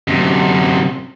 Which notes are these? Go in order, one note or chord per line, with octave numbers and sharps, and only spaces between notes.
F#2 C3